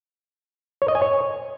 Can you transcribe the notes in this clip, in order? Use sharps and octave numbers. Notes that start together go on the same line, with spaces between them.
C#5
D#5
G#5
C#5